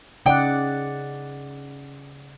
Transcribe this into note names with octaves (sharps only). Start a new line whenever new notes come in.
C#3 D#4 D5 F#5 G5